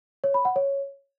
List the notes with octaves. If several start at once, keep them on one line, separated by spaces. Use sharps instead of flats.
C#5
B5
F#5
C#5